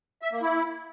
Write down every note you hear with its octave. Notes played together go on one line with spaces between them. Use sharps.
E5
A#3
E4